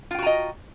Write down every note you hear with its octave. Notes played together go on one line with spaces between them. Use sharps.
F4 F#4 D#5 G5 A#5